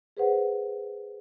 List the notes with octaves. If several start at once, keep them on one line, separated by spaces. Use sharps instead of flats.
G#4 B4 C5 F#5